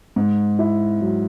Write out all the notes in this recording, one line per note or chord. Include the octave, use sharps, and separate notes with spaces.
G#2
E4
F#3